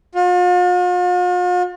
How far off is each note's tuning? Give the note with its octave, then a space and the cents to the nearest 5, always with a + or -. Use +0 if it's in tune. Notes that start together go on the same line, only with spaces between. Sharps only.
F4 +45